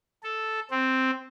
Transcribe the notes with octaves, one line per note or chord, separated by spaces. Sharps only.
A4
C4